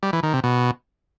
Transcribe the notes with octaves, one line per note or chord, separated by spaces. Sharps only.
G3
E3
D#3
C3
B2